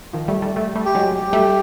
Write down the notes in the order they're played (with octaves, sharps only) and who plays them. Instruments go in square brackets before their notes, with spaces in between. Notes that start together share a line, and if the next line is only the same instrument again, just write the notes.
[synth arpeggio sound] D#3 F3
G3 A3
G3 A3
G3 A3
G3 A3
[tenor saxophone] G4
[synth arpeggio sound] F#3 G#3
[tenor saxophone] G4
[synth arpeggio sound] G3 A3